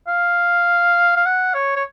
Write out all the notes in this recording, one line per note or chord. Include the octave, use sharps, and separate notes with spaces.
F5
F5
F#5
C#5
C#5